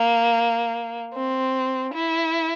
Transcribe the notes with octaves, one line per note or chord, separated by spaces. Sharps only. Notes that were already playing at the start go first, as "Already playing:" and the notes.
Already playing: A#3
C4
E4